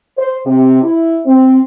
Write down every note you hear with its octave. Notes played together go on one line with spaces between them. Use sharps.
C5
C3
E4
C4